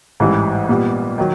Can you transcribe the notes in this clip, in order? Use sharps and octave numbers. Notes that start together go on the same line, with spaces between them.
A1 G#2 E3 G3
A#2 G3 B3
D#3 F#3